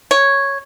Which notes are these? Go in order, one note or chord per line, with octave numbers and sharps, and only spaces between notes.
C#5